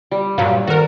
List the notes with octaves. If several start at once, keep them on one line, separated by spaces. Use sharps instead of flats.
G3
G2 A#2 F#3 F5
D#3 F#4 A4 A#4